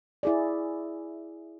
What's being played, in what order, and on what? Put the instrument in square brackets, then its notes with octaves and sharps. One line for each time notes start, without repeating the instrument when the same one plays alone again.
[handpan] E4 G#4 D5